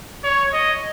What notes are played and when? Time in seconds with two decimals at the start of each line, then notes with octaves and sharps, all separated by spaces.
0.24 C#5
0.53 D#5